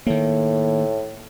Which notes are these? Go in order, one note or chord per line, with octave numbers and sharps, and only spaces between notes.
A2 D#3 A#3